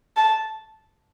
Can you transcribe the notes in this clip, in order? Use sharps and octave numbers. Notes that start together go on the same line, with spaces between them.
A5